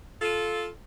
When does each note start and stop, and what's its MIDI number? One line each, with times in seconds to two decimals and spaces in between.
0.21 0.68 65
0.21 0.68 69